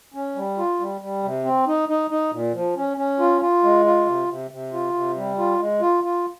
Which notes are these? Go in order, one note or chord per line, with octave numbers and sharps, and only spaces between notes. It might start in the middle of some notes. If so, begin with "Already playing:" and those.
C#4
G3
F4
G3
G3
C3
C4
D#4
D#4
D#4
A#2
F3
C#4
C#4
F4
F4
G#3
F4
C3
C3
C3
F4
C3
G3
F4
G#3
F4
F4